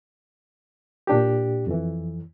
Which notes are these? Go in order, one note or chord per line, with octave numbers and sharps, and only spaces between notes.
A#2 D4 G4
F2 E3